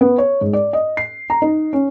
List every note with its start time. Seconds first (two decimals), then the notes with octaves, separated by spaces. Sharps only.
0.01 B3
0.18 C#5
0.41 G#2
0.53 D5
0.73 D#5
0.97 C7
1.30 A#5
1.42 D#4
1.73 C#4